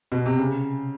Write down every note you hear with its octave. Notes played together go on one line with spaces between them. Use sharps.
B2
C3
C#3